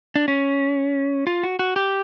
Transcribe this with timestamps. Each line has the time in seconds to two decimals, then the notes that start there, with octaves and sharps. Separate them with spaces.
0.16 D4
0.28 C#4
1.27 F4
1.43 F#4
1.59 F#4
1.76 G4